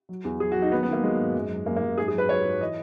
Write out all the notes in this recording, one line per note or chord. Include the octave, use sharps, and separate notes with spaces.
F#3
E2
F#3 G#4
F#4
F#3
D#4
D#3 B3
B3
D#3 A#3
F#3 G#3
G#2
F#2
F#2
F#2 A#3
A#3
F#2
G#2 G#4
G#4
F#3 B4
F#3 C#5
G#2
E3 D#5